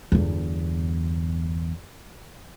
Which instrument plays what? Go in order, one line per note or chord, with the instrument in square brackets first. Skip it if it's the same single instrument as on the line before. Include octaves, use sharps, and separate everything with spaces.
[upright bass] G1 E2